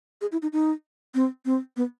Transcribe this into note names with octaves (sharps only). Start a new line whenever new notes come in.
G#4
E4
D#4
D#4
C4
C4
B3